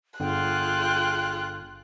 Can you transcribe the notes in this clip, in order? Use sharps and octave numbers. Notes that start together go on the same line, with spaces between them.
G1 D3 F4 G#4 G5 F#6